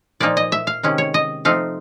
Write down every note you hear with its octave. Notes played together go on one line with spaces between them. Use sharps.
A#2 F3 A#3 D#4 D5
D#5
E5
F5
C3 D#3 G#3 C#4
C#5
D#5
F3 A3 C4 D#4 F5